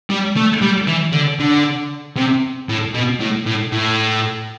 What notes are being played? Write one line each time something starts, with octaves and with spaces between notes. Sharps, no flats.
G3
A3
G3
E3
D3
D3
C3
A2
B2
A2
A2
A2